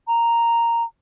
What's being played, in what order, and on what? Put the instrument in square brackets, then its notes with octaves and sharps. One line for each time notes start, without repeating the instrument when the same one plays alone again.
[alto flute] A#5